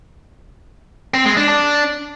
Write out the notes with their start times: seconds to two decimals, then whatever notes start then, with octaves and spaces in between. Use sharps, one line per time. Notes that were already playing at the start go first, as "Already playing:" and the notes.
1.14 C4
1.26 G#3
1.37 D4
1.49 D4